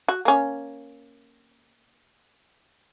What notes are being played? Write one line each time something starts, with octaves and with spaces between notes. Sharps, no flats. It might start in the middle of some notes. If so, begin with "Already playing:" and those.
F#4
A#3 C#4